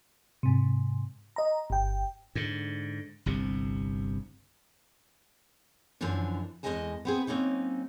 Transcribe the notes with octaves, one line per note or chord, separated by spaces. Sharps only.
G#2 C3
D#5 A#5
G1 G5
G#2 D3
G1 C2 C3
F#2 D3 E3 F3 D4
E2 G2 G#3 D#5 G#5 A5
B3 C4 G#4
F#3 A#3 C4 C#4 D#4